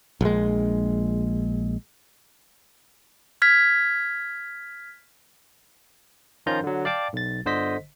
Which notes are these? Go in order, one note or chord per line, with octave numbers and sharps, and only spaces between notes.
A#1 G#3
F6 G#6 B6
D#3 F3 C#4 F4 A#5 G6
D3 F#3
D5 F5 G5 A5 D6
B1 A6
G1 D3 C5 D#5 B6